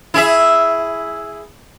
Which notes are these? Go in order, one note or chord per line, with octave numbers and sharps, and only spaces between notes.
E4 G#4 E5